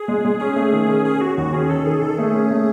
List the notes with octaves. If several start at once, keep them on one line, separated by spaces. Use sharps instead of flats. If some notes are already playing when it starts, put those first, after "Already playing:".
Already playing: G#4
G#3
G#3
C#4 G#4
A3
D#3
C#4
C#4 G#4
C#4 F#4
D#2 F#4
C#4 G#4
D#3 A4
D#3 G#4
D#3 A4
A3 G#4
C#4
A3